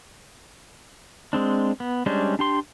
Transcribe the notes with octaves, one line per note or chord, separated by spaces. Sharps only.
G#3 C4 D4
B3
G3 G#3 C#4 D4 C5
D4 G4 C6